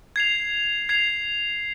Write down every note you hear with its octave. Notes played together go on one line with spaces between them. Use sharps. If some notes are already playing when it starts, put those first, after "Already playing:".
G#6 C7 F7
G#6 C7 F7